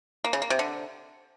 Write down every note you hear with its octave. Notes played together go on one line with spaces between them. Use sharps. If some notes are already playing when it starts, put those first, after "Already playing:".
A#3
C#3
A#3
C3
D3